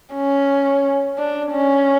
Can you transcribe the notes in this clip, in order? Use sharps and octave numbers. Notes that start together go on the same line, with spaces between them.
C#4
D4
C#4